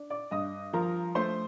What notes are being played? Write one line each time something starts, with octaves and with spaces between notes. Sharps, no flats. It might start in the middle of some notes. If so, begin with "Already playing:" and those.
Already playing: D4
D5 D6
G2 D#5 D#6
F3 A#4 A#5
A3 C5 C6